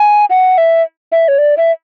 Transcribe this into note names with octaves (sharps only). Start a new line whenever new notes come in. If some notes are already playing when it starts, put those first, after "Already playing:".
Already playing: G#5
F#5
E5
E5
C#5
D5
E5